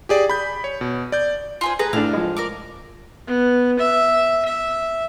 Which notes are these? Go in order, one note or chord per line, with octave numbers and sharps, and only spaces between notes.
G4 G#4 D5
B5 G6
C#5
B2
D5 G6
F4 G#4 C5
G#4 B4 A#5
A2 D4 F5
F3 G#3
A#4 D5 D6
B3
E5
E5